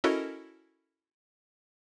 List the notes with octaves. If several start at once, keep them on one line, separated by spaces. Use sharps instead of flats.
C#4 E4 F#4 A4 A#4 D#5